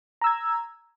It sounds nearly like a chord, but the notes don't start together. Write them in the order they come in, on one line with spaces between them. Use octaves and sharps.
A#5 E6 G#6